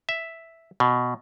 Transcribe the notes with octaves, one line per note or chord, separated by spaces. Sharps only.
E5
B2